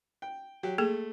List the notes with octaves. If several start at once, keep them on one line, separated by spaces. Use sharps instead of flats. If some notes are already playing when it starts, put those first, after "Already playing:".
G5
F#3 G4
A3 A#3 G#4